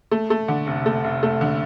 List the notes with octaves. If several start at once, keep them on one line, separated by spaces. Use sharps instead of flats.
A3
A3
D3
F1
A3
F1
A3
D3